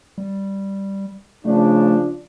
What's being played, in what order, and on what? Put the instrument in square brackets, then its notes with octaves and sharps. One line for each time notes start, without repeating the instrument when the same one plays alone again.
[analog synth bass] G3
[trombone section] C#3 F3 D4 [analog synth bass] A3